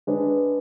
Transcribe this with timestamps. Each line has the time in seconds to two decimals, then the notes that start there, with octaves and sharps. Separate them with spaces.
0.07 G#3 D4 G#4 B4